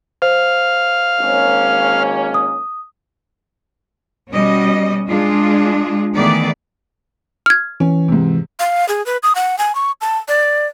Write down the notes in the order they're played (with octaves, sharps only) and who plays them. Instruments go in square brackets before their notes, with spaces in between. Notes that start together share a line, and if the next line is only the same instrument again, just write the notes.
[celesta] C5 [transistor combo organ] F5
[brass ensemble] G#1 A#3 C#4
[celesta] D#6
[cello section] B2 G3 C#4 F#4 D#5
G#3 D4 F4 G#4
D#3 E3 A3 B3 G#4 D5
[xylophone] F6 G#6
[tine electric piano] E3 [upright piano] C#4
[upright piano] G#2 C3
[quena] F5
G#4
B4
D#6
F#5
G#5
C#6
A5
D5